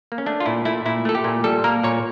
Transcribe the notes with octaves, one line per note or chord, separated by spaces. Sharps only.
A#3
C#4
A3 D4
F4
A#2 E4
A3 E4
A#2 E4
A3 A4
G4
A#2
G3 A4
A#3 A#4
A#2 C#5